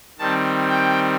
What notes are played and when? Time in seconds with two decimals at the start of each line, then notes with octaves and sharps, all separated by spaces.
0.19 D#3 G3 C4 A5
0.69 G5